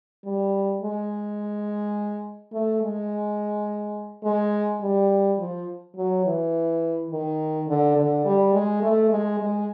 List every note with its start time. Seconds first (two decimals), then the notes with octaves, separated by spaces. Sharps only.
0.24 G3
0.82 G#3
2.53 A3
2.82 G#3
4.24 G#3
4.81 G3
5.38 F3
5.96 F#3
6.25 E3
7.10 D#3
7.68 D3
7.96 D3
8.25 G3
8.54 G#3
8.82 A3
9.10 G#3
9.39 G#3